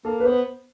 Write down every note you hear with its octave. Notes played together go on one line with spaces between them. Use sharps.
A#3 A4
B4
B3 C5